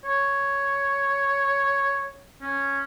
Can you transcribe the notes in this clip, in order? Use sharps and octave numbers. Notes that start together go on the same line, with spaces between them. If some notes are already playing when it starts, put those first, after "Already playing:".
C#5
C#4